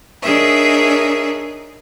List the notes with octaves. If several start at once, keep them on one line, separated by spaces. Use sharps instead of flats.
D4 D#4 G#4 A#4 C#5 E5